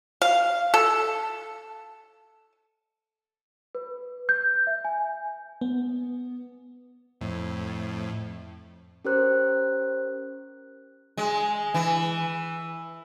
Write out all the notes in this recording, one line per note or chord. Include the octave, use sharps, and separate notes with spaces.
F5
A4
B4
G6
E5
G#5
B3
F2 A2
C#4 G4 A#4 C5 F#6
G#3
E3